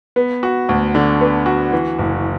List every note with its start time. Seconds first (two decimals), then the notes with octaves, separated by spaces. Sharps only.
0.16 B3
0.43 F#4
0.69 D2
0.95 D3
1.21 B3
1.46 F#4
1.72 E3
1.98 F#1